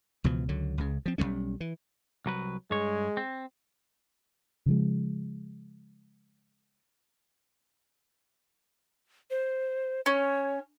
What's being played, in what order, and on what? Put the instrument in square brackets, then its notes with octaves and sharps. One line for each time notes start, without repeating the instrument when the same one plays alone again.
[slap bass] C#2 B2 E3 F3
C#2 D3 F#3
C#2 C#3
F3 C4
B1 F#2 G3 C#4
E3
[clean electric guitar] C2 F#3 B4
[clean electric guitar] G2 C#5 [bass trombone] G#3
[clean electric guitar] C4
[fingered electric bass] C#3 F3 G#3
[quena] C5
[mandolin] C#4 [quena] C#5